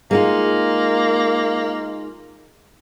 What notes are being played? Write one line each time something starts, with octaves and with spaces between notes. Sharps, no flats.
G#3 A#3 D#4 F4